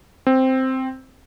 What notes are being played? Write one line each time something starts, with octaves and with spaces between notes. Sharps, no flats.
C4